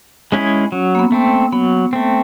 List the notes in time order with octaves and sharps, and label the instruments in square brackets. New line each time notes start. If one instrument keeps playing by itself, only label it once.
[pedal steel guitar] G#3 C#4 E4 G#4
[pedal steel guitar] F#3 [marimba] C#4
[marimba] A#3
B3
[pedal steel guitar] A3 C4
[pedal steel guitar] F#3 [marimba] B3
[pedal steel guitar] A3 C4